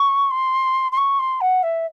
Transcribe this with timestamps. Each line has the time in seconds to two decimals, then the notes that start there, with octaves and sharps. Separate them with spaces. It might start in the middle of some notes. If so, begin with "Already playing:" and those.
Already playing: C#6
0.30 C6
0.92 C6
0.97 C#6
1.19 C6
1.40 F#5
1.62 E5